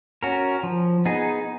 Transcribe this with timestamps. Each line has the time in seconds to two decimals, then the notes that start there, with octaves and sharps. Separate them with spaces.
0.23 C#4 F#4 A#4
0.63 F3
1.05 B3 D#4 G#4